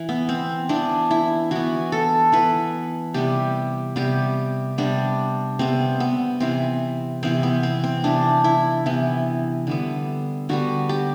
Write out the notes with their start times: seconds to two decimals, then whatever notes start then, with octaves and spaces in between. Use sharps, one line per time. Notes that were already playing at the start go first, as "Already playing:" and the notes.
Already playing: E3
0.09 B3
0.29 C4
0.69 E3 B3 D4
1.11 E4
1.51 E3 B3 F#4
1.92 A4
2.32 E3 B3 B4
3.14 C3 G3 B3 G4
3.96 C3 G3 B3 G4
4.78 C3 G3 B3 D4
5.59 C3 G3 B3 C4
6.00 B3
6.40 C3 E3 B3 C4
7.23 C3 E3 B3 C4
7.43 B3
7.63 C4
7.84 C4
8.04 C3 E3 B3 D4
8.44 E4
8.86 C3 E3 B3
9.67 D3 G3 B3
10.49 D3 G3 B3 F#4
10.89 G4